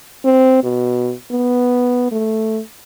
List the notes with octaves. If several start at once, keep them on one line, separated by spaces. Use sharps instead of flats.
C4
B2
B3
A3